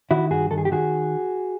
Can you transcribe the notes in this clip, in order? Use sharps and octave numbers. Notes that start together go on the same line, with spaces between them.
D#3 E4 F#4
G2 F#4 G#4
D#3 A4
G#4
G4
D#3 F#4 G#4